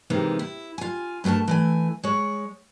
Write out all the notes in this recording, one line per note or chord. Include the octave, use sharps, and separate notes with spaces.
C3 D#3 E3 G#3 A#3
E4
F4 G#5
G2 A3 G#4 A#4 A5
E3 A3 G#5
G#3 C#5